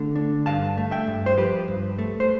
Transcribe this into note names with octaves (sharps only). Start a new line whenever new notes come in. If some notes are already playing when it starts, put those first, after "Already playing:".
Already playing: D3 A3
D4
G2 F5 A5
A3
E5 G5
G2
C5
F3 G4 B4
G2
A3
C5